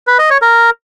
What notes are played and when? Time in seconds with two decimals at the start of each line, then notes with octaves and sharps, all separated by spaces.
0.07 B4
0.19 D#5
0.30 C#5
0.42 A#4